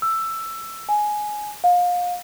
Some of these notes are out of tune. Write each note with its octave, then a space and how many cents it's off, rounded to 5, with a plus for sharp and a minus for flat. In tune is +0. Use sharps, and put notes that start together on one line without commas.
E6 +10
G#5 +10
F5 +30